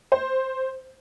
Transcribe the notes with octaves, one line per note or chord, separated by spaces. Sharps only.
C5